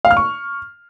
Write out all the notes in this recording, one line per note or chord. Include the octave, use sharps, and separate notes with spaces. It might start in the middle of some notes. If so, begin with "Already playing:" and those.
F5
F6
C#6